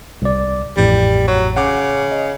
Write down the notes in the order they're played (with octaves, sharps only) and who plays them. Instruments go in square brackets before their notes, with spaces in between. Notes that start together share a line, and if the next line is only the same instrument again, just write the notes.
[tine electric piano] C2 D5
[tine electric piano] A1 F2 A2 [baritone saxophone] G3
[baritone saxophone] F#3
[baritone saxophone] C#3 [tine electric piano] F#5 D6
[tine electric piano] D#5